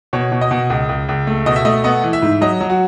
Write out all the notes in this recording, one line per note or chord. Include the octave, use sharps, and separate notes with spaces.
B2 C#5
B2
D#5
B2
C#2
C#2
C#2
A3
B2 D#5
E5
A3 D#5
B3 D#5
E3
E5
G#2
F#3 D#5
F#3
F#4